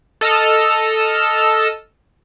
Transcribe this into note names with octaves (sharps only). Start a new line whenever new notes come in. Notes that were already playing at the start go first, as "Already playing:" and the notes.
A4 D#5 E6 F6